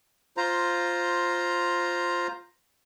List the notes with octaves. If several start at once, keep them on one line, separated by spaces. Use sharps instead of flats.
F4 C5 A#5